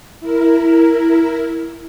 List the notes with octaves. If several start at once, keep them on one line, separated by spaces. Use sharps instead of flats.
E4 A#4